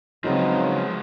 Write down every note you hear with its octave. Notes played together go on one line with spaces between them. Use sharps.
C#3 F3 F#3 G#3 B3 C4 D#4